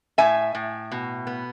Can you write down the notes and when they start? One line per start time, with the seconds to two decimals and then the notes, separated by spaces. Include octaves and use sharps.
0.18 A2 E5 G#5
0.55 A2
0.92 B2
1.27 B3